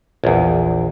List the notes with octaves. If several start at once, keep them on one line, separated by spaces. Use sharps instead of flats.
A#1 E2